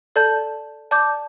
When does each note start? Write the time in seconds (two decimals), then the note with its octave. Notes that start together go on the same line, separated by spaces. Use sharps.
0.16 A4 D5 A5 G6
0.91 D5 A5 D6 G6